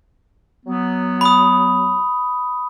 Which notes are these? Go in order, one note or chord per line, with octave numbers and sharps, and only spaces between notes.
F#3 B3
B5 D#6